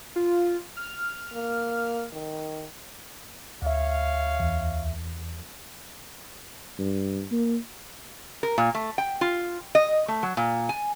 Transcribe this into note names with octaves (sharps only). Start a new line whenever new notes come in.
F4
F6
A#3
D#3
D2 C#5 E5 F5
E2
G2
A#3
A#4
A#2
A3
G5
F4
D#5
A3
F#3
A#2
G#5